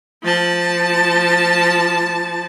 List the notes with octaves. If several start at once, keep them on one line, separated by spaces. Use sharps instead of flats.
F3 A5